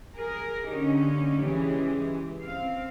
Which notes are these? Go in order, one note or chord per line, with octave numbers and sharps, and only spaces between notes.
G#4 A#4
D3 A#3 C#4 D#4 G4
C#3 E3 G#3 G4 G#4
C4 F5